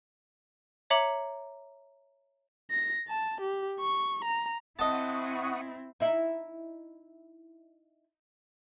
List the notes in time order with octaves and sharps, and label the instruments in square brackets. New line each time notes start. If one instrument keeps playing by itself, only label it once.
[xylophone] C#5 E5 A#5 D6 C#7 F#7
[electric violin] A#6
A5
G4
C#6
A#5
[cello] C4 E4 [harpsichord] D#5 A5 [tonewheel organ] F#5 C#6 D#6
[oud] D#4 E4